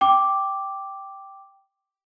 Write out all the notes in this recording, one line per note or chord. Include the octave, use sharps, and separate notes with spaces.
G5 D6